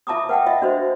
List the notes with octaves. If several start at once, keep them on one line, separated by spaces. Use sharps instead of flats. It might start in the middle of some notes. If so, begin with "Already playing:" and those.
F4 E5 A5 A#5 D6 D#6
B4 F#5 G5 A5
F4 D#5 E5
D4 F#4 C5